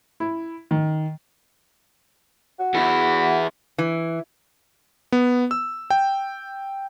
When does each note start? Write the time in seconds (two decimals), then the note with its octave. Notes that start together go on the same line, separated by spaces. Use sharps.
0.20 E4
0.71 D#3
2.59 F#4
2.74 E2 E4
3.78 E3
5.12 B3
5.51 E6
5.90 G5